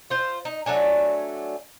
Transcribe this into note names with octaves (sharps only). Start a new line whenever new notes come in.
F4 C5
D#4
F#3 A3 D4 G#5